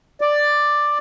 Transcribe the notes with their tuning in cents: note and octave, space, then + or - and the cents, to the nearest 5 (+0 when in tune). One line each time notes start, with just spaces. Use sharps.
D5 +5